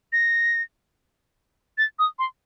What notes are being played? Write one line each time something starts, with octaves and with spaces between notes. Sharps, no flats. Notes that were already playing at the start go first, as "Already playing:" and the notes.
A#6
A6
D#6
C6